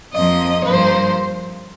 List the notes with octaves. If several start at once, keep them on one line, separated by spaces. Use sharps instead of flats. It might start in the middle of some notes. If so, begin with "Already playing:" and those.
F2 F3 A#3 D#5
G2 F3 A#3 C5